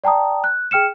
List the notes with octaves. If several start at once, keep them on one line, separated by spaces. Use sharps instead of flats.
D5 G5 A5 A#5 D#6
F#6
G#4 G5 F6 C#7 E7